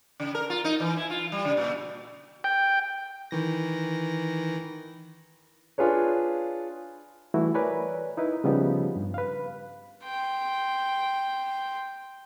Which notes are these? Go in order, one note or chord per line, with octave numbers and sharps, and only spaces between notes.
C#3
A#4
F4
D#4
E3
E4
F4
G3
C#3
A#2
G5
D#3 E3 A#6
D4 F4 G#4 B4 C#5
E3 G3 A3 E4 F#4
A#4 B4 C#5 D5 G#5
D#4 E4 B4
C#3 F3 G3 B3 D#4 G4
G2
B4 F5
G5 C6